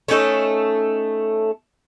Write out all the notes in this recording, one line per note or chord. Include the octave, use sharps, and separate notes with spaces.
A3 C#4 D#4 A4